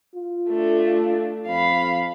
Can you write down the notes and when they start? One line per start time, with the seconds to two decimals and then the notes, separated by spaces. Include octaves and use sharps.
0.15 F4
0.50 A3 D4
1.47 F2 F5 B5